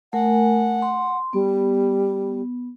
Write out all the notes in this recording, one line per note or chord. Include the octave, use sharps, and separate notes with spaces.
A3 A#4 F#5 G#5
C6
G3 B3